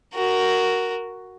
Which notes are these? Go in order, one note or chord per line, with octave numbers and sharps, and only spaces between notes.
F#4 A#4